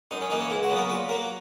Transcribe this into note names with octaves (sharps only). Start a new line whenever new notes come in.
F#2 D#4
C#4
E3 A#3 D#4
C#4
C#2 E4
F#4
C#3 F#3 B3
A#4
A#2 B4
F#3 A#3 A#4